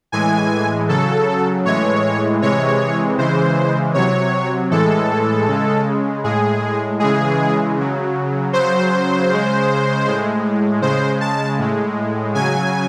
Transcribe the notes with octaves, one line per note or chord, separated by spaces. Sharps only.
A2 E3 G#3 G#5
C#3 F#3 A4
A2 E3 G#3 C#5
C3 E3 G#3 C#5
C#3 E3 G#3 C5
C3 F#3 C#5
A2 E3 G#3 A4
C#3 G#3
A2 G#3 G#4
C#3 E3 G#3 G#4
C#3 F#3
C#3 F#3 C5
C#3 G#3
A2 G#3
C#3 G#3 C5
A5
A2 G#3
C#3 F#3 G#5